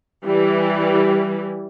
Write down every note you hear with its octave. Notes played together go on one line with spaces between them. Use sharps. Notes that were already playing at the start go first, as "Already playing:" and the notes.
E3 G3